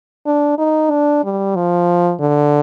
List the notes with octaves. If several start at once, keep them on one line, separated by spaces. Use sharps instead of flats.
D4
D#4
D4
G3
F3
D3